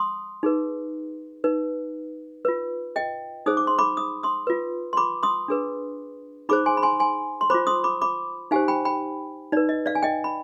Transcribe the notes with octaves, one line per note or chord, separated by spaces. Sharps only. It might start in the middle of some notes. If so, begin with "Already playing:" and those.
Already playing: C6 D#6
D#4 G#4 B4
D#4 B4
F4 B4
D#5 G5
D#4 G#4 C5 D#6
D6
C6
B5 D6
D#6
C6 D#6
F4 B4
C6
B5 D6
C6 D#6
D4 G#4 B4
D#4 G#4 C5 B5 D6
G#5 C6
B5
G#5 C6
G#5 C6
C6
F4 C5 B5 D6
C6 D#6
B5 D6
B5 D6
D#4 G4 C5 F5 G#5
G5 B5
G5 B5
D#4 B4 D5
D#5
D5 F5
G#5
D#5 G5
B5